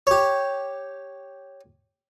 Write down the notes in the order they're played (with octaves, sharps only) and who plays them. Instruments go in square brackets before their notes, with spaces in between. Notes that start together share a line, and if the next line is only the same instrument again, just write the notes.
[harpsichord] G4 C#5